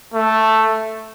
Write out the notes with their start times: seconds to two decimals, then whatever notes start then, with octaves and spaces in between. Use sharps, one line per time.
0.14 A3